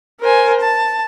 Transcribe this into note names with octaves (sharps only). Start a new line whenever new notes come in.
A#4 C5 G#5
A5